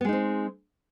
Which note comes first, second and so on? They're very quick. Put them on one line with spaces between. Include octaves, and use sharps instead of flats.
B3 G#3 D#4 C4